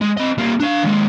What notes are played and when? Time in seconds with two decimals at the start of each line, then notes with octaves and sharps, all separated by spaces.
0.01 G#3
0.17 C4 D#5
0.38 G3 A#3
0.60 D4 F5
0.83 D#2 G#3